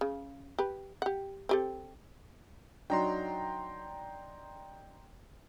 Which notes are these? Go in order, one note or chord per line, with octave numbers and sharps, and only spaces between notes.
C#3
G4 B4
G4 F#5
C4 G4 A4
F#3 D4 D#4 G5 A#5 C6